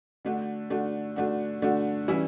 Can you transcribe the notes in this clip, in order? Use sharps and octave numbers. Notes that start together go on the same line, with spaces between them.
D3 A3 D4 F#4
D3 A3 D4 F#4
D3 A3 D4 F#4
D3 A3 D4 F#4
E3 G3 C#4 E4